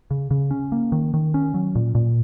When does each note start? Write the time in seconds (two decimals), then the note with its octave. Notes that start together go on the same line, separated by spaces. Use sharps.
0.11 C#3
0.31 C#3
0.51 C#4
0.72 A#3
0.92 D#3
1.14 D#3
1.34 C#4
1.54 F#3
1.75 A#2
1.95 A#2